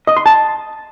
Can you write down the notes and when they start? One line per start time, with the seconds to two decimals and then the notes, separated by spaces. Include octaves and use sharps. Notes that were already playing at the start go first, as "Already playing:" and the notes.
0.07 D#5
0.17 C6
0.26 A5